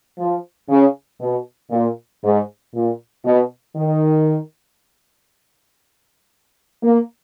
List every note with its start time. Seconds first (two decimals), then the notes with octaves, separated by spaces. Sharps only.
0.19 F3
0.69 C#3
1.20 B2
1.71 A#2
2.23 G#2
2.74 A#2
3.25 B2
3.76 D#3
6.83 A#3